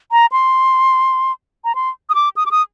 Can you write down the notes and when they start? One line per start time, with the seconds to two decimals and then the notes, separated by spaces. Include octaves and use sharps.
0.12 A#5
0.32 C6
1.65 A#5
1.75 C6
2.10 D#6
2.15 D6
2.36 D#6
2.46 D6
2.51 D#6